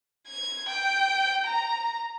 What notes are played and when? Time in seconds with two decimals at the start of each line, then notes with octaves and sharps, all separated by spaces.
0.27 G#6
0.68 G5
1.46 A#5